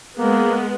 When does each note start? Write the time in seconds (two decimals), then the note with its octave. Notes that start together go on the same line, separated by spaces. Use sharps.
0.18 G#3 A#3 B3